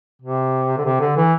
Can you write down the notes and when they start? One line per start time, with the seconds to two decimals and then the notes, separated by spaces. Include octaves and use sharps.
0.22 C3
0.78 D3
0.85 C3
1.00 D3
1.17 E3